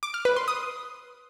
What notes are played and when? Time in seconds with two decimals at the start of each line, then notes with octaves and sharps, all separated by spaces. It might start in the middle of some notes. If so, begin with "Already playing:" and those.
0.03 D6
0.14 F6
0.25 B4
0.36 C6
0.48 D#6